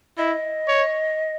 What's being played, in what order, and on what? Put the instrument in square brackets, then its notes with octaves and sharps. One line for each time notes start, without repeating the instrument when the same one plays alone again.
[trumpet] E4 [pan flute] D#5
[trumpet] C#5